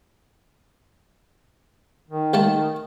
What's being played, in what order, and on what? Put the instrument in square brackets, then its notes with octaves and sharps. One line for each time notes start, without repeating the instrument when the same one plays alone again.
[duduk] D#3
[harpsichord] D#2 A3 A5